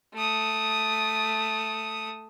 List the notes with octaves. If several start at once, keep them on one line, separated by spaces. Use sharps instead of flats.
A3 D#6